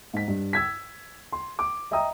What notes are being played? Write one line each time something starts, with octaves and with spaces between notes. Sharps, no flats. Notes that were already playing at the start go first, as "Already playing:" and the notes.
G#2 B6
G2
E6 G#6 B6
C6
D6
D#5 E5 G5 A#5 D#6